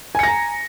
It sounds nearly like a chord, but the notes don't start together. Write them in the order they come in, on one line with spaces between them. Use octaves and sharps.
G#5 C#7 A#6 A#5